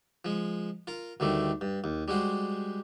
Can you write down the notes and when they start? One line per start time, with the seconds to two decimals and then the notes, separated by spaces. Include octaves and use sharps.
0.25 F3 G#3
0.87 F4 A#4
1.20 D2 D#3 G3 A3
1.61 G2
1.84 D#2
2.08 G3 G#3 F#4 C5